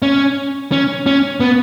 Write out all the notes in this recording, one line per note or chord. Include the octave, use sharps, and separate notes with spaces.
C#4
C#4
C#4
B3